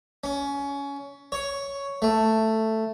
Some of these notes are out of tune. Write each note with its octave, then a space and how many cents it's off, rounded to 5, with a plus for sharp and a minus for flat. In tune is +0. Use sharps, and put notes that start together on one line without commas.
C#4 +20
C#5 +5
A3 +5